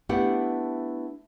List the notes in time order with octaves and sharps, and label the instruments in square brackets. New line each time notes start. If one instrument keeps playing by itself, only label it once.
[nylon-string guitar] A3 B3 D4 E4 G4 F#5